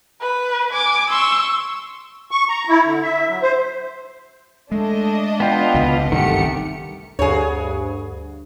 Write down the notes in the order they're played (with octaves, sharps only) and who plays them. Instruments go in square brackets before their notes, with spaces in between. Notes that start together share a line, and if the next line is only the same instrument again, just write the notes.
[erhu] B4
[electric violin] G#5 [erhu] D6
[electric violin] C6 C#6 [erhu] E6
[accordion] C#6
A#5
E4
D3
E5
F#3
C5
[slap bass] G#3 [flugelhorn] A3 [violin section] D4 D#5
[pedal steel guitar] B3 F4 [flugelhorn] G5
[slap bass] C#2 B2 D3 [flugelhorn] B4
[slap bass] F#1 C2 G2 [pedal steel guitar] D#3 G4 [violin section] A3 C#7 [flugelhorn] F#5
[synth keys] D2 G2 [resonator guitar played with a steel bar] G#4 C#5